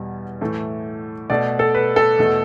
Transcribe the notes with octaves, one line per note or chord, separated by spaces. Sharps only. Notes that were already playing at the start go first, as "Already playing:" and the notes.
Already playing: E2 B2 G3
A2 E3 A3
B2 A3 D5
A4
B4
A4
E2 B2 A3